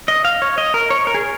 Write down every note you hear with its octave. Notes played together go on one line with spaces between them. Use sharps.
D#5
F5
C#5
D#5
A#4
C#5
A#4
G#4